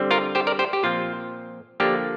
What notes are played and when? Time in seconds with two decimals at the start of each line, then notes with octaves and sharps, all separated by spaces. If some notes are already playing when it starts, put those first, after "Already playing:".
Already playing: D3 G3 C4
0.11 F4 A#4
0.35 G4 C5
0.47 A#4 D5
0.59 G4 C5
0.73 G4
0.83 A#2 F3 C4 F4
1.80 D3 F3 A#3 D4 G4